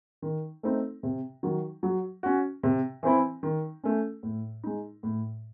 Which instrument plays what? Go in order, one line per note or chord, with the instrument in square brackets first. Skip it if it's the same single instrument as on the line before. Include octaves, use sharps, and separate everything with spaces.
[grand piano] D#3
A3 C4 D#4
C3
D#3 F#3
F#3
C#4 F#4
C3
E3 C4 E4
D#3
A3 C#4
A2
G#3 D#4
A2